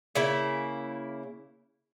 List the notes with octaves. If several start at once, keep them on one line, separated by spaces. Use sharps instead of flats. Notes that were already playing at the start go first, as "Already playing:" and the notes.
C#3 A#3 E4